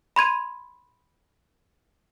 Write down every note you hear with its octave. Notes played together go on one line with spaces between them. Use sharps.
B5 C6 G#6 D#7